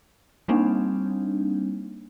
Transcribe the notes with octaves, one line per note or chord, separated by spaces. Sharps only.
G3 A#3 C4 D4 D#4